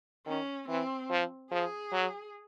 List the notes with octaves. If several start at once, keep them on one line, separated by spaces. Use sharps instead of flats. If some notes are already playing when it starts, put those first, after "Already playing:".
D#3 C#4
E3 C4
F3
F3 G#4
F#3